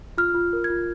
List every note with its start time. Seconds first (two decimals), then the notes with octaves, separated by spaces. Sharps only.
0.18 F4 F6
0.35 F4
0.53 A#4
0.64 G#6
0.70 F4